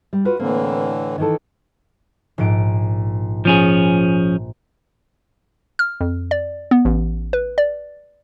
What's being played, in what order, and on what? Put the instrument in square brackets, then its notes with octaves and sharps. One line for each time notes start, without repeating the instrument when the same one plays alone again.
[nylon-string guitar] G3
F4 F#4 B4
[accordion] A2 D3 E3 [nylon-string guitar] A#3 C4
[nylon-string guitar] D#3 E3 A4
[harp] A#1 G#2 D7
[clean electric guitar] F3 C#4 G#4
[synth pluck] F6
F2
D5
B3
A1
B4
D5